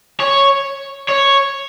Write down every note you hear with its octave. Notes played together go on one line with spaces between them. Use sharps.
C#5
C#5